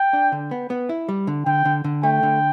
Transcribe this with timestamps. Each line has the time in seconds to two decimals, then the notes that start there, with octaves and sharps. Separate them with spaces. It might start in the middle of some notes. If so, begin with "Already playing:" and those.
Already playing: G5
0.13 D4
0.32 D3
0.51 B3
0.70 B3
0.89 E4
1.09 G3
1.27 D3
1.46 D3 G5
1.65 D3
1.84 D3
2.03 A3 G5
2.23 D3